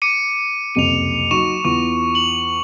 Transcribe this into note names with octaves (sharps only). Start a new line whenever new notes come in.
D6 C#7 D#7
F#1 C2 F2 D#7 F7
F#3 D#4 C#6 E7
E2 E4 F4 C#6
F#7